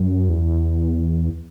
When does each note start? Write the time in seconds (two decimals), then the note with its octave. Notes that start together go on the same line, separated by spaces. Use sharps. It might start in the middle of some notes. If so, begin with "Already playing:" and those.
Already playing: F#2
0.29 E2